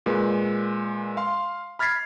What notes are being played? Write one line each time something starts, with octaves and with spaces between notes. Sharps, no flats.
A#2 G#3 B4
F5 C6
B5 F6 G#6 A6 B6 C7